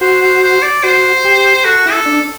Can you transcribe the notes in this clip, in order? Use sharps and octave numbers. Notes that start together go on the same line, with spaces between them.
F#4 C5
C5
C5
D5
F#4 C5
G4
F#4 A4
E4
A4
D4